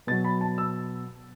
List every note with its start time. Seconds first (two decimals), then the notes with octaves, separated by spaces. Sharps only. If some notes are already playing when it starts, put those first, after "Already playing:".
0.07 B2 A6
0.11 F#3
0.24 B5
0.41 A5
0.58 E6